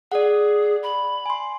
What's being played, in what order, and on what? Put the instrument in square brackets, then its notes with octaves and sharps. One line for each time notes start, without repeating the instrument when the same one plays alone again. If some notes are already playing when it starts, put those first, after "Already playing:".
[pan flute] G#4 [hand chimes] D5 F#5
[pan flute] B5
[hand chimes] G#5 C6